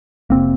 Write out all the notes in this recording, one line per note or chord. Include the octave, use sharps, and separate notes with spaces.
F1 C3 A#3 C4